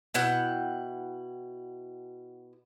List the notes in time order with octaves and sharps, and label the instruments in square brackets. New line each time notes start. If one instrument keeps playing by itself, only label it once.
[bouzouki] B2 E4 F#5 G5